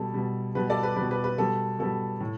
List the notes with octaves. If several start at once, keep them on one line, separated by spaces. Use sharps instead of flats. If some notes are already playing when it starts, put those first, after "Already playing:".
Already playing: B2 G3 A4
B2 G3
B2 G3 B4
A4 D5
B4
B2 G3 B4
B4
B4
B2 G3 A4
B2 G3 A4
A2